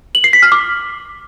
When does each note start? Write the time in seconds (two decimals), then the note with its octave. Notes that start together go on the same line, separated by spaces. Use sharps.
0.15 F#7
0.24 C7
0.33 B6
0.43 F6
0.52 D6